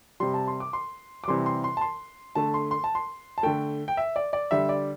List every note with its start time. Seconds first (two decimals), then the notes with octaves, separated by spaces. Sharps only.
0.20 C3 G3 C6
0.34 A5
0.48 C6
0.60 D6
0.73 C6
1.24 D6
1.28 C3 E3 G3 C6
1.46 C6
1.64 C6
1.77 A5
1.81 C6
2.35 D3 A3 A5
2.54 C6
2.71 C6
2.84 A5
2.95 C6
3.38 A5
3.43 D3 A3 G5
3.88 G5
3.97 E5
4.16 D5
4.33 D5
4.51 D3 G3 E5
4.69 D5